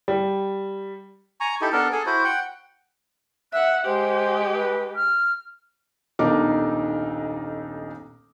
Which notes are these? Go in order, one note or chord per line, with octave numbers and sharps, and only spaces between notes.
G3
G#5 A#5 C#6
D#4 E4 G4 A4
B3 D4 A4 A#4
G#4 A4 G#5
E4 F#4 C5
F#5 G5
E5 F#5 F#6
G#3 G4 C5
B4
F6
D#1 B1 D4 D#4 A#4 D6